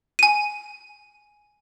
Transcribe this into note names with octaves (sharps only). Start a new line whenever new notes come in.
G#5 D#7